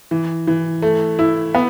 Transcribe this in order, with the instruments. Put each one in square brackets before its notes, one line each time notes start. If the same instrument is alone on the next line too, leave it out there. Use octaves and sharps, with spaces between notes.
[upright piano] E3
E3
A3
E4
B3